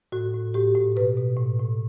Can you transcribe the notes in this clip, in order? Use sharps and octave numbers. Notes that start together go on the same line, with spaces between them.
A2 F#4
A2
A2 G4
A2
B2 B4
B2
A2
A2